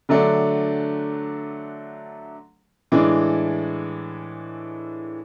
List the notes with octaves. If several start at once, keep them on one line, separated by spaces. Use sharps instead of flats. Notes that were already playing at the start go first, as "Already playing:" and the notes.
D3 F#3 A3 D4
A2 E3 G#3 D4